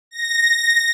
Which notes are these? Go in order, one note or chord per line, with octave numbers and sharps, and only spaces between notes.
A#6